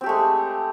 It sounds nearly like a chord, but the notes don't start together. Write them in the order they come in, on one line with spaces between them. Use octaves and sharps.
C4 G4 A3 G#3